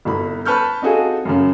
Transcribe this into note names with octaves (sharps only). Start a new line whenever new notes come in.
G1 C2 B5
B4 A5 C#6 F6 G6
C4 D#4 F4 F#4 G#4 A4
F#2 C#3